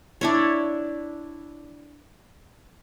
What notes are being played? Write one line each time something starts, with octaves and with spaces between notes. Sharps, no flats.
D4 E4 C#5